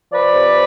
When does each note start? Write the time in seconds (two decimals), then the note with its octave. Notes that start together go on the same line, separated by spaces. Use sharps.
0.12 F3 B4 D5
0.34 C3